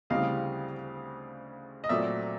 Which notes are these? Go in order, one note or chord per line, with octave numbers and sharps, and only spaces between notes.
D2 C#3 E3 G3 C4 D#5 F5
D#5
A#2 F#3 A3 C4 D5 E5